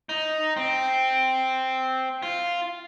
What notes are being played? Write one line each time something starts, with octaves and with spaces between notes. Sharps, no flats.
D#4
C4
F4